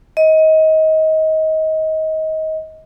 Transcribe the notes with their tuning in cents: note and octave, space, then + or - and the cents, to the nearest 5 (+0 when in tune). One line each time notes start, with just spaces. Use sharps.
D#5 +25